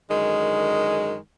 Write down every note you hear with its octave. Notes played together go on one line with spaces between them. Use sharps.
F#2 D3 D#3 G#3